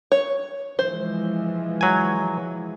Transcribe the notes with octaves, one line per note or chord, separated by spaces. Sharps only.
C#5
E3 F3 G#3 C5
F#3 G#5